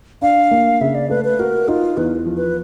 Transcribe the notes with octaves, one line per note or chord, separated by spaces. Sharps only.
D4 F5
A#3
C#3 E5
D5
A3 B4
B4
F#4 A#4
D#4 F4
E2 B4
F3
B4